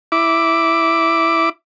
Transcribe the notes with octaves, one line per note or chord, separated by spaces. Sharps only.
E4 D6